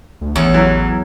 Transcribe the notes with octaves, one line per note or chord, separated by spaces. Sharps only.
D2
A1 E2 C#5
E3 F#3